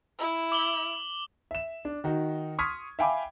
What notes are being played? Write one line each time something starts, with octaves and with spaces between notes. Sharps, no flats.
E4
D6 F#7 G7
E5 E7
D4
D#3 D#4 F#4
C6 C#6 D#6 F6 G#6 B6
E5 F5 G5 G#5 B5 D6